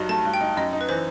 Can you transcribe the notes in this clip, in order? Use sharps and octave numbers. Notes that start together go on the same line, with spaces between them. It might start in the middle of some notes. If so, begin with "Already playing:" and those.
Already playing: G2 F#3 D#4
A3 A5
G2
G5
D#4
F#2 D#5
D#4
B4
E3 C5